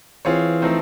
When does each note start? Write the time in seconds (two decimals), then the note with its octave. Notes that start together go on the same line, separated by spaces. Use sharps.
0.25 E3 C4 F4 G#4 C#5
0.62 F3 A3 C4 D#4